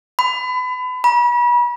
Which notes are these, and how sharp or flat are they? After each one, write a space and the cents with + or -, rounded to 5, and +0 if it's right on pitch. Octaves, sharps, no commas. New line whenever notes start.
B5 +30
B5 -35